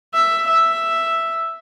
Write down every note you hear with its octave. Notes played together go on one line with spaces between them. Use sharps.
E5
E5